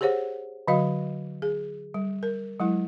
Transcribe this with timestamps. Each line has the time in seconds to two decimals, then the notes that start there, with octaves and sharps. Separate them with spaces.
0.01 G4 G#4 C5 C#5 F#5
0.68 D3 F#3 F#4 D#5 F5
1.42 G#4
1.94 G3
2.23 A#4
2.60 F#3 G#3 E4